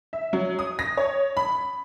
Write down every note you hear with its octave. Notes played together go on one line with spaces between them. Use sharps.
E5
F#3
D#6
A#6
C#5
B5